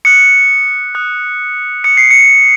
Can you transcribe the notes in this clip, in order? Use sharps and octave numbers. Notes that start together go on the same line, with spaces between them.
D#6 F#6 C#7
D#6 F#6
D#6 F#6 C#7
C7
C#7